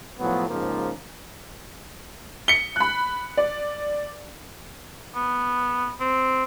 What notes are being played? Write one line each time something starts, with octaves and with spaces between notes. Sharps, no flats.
A2 F3 F#3 B3
G#2 C#3 F3 A#3
C#7 G7
B5 F#6
D5
B3
C4